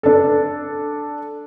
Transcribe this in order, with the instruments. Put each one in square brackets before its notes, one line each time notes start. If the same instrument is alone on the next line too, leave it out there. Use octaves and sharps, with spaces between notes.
[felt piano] D4 A4